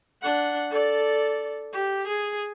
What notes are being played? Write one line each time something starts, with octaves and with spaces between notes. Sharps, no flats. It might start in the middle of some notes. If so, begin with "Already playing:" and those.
D4 F#5
A4 D5
G4
G#4